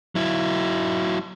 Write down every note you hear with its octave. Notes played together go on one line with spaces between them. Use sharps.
F#3 E4